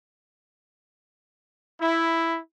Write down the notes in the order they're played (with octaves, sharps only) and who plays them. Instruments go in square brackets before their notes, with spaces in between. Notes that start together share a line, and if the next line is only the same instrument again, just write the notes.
[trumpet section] E4